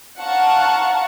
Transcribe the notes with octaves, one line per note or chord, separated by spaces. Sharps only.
F5 F#5 A5 A#5 C#6